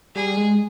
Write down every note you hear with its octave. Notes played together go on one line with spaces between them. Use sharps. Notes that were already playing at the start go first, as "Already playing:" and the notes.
G3 G#4
G#3